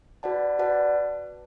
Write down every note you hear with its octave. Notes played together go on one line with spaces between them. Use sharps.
F#4 B4 D5 F#5 A5
F#4 B4 D5 F#5 A5